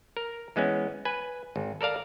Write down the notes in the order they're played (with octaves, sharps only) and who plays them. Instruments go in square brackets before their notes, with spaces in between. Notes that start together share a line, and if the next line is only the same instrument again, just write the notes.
[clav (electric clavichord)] A#4
E3 G#3 B3 C#4
B4 G#5
G#1
A4 A#4 D5 F5 A#5